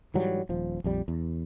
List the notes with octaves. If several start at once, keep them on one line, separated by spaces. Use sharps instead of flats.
G#2 E3 F#3 G3
D#1 F3
A#1 F2 G3
E2